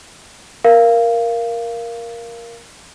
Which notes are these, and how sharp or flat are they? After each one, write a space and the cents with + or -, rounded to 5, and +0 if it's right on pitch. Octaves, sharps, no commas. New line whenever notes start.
A#4 +5 F5 -15